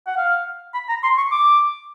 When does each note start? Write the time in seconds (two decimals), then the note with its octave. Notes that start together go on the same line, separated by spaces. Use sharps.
0.06 F#5
0.17 F5
0.74 B5
0.89 A#5
1.03 C6
1.17 C#6
1.32 D6